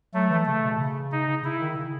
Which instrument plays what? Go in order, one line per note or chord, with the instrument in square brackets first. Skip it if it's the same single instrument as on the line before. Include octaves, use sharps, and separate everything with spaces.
[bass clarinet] F#3 [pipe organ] A3
[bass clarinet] E3
[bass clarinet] C#3 [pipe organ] A3
[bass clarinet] B2
C#3
[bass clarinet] C#3 [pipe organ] D#4
[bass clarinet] C#3
[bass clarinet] C#3 [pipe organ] E4
[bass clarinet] D#3
C#3